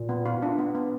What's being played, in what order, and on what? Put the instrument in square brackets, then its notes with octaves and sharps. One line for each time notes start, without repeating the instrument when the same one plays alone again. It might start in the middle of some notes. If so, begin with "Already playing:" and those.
Already playing: [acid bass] A#2
[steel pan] B3
F4
D4
B3
B3